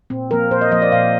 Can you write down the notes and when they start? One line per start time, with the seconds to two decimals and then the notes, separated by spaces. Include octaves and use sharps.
0.10 A#2 C4
0.31 F3 A#3 A#4
0.51 A#2 C5
0.61 D#5
0.72 F3 A#3 D#5
0.82 D5
0.92 A#2 F5